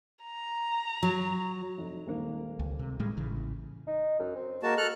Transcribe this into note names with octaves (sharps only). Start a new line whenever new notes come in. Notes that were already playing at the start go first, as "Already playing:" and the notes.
A#5
F#3
F1
D#1 G#1 A#3
C#2
C3
A2 G3 G#3
A1 C#3 E3
D#4
F#2
C4
G#3 A#3 F#4 A5
A4 F6 F#6